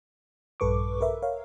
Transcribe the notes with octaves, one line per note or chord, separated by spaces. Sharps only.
A#1 G2 A4 B4 C#6 D6
A#4 B4 E5
A#4 C#5 F5